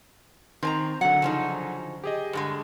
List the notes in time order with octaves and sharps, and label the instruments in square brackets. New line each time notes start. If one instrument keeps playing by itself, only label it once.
[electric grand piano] D#3 [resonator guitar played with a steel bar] C4 G#5 A#5
[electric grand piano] D3 F#3 [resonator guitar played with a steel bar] F#5
[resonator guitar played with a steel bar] C#3 F3 D#4
[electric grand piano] G4 G#4 D#5
[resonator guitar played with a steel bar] G2 D3 G#3